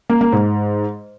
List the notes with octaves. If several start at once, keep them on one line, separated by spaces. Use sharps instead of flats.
A#3
A#3
G#2